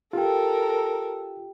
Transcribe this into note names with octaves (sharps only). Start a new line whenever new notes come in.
F4 G4 A4 A#4 G5